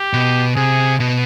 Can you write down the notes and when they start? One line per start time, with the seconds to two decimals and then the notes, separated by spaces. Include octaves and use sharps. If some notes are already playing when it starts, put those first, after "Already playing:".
Already playing: G4
0.13 B2
0.56 C3 G#4
1.00 B2